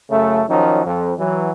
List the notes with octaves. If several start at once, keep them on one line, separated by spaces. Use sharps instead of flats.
F#2 C#3 A3
D#3 F3 F#3 C#4 D#4
F2
E3 F#3